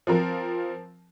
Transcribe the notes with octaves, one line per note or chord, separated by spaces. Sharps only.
F3 C4 A#4